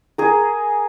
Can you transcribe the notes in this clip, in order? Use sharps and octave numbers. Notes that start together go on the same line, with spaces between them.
G#4 A#4